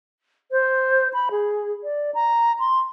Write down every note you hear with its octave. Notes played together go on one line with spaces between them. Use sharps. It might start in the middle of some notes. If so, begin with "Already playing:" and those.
C5
B5
G#4
D5
A#5
C6